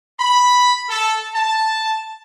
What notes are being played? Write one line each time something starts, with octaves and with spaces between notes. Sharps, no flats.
B5
A4
A5